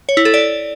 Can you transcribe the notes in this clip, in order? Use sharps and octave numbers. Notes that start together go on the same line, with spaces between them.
C#5
E4
A4
D5